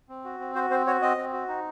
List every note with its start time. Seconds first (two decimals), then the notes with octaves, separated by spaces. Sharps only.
0.09 C4
0.25 F#4
0.40 C4
0.55 F#4 C5
0.70 C4 C5
0.87 F#4 C#5
1.02 C4 D#5
1.17 C4
1.33 F#4
1.48 D#4